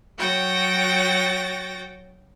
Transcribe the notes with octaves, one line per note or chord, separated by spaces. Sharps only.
F#3 F#4 C#5 G5 A6 A#6